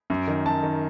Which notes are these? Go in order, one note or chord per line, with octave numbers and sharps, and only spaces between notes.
F#2
D#3
F#2 A5
D#3